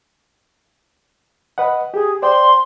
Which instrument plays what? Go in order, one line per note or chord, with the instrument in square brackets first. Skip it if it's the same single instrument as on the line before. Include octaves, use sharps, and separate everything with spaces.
[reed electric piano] B4 D#5 F#5
[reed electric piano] G4 [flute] G#4
[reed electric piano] C5 D5 G5 [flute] C6